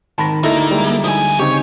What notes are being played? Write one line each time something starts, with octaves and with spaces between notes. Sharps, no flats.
G#2 D#3 A#4 A5 B5 A#6
D2 A#3 D#4 E4 A4 D#5
G3 G#3
F3 G#5
C#3 C4 D#4 G4 C#5